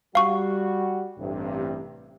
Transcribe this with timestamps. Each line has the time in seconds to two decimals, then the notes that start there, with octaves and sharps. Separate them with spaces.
0.15 G3 F#4 F5 C#6
1.18 A1 G2 C3